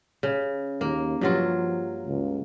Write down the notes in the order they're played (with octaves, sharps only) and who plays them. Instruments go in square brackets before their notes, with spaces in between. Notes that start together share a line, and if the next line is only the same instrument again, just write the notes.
[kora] C#3
[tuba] D#2 [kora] A#3
[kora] G2 F#3 F4 [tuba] F3
[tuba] C#2